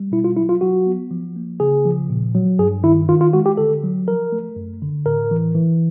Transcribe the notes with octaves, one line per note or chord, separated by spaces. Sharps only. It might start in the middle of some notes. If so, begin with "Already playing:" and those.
Already playing: G3
B2 E4
F4
F#3 E4
F4
F#3 F#4
B3
F3
A#3
C#3 G#4
F3
A#2
F#3
G2 G#4
D#3 E4
D#3 F4
F4
G#3 F#4
G4
D3 A4
F#3
F3 A#4
A3
F#2
D3
A2 A#4
E3
E3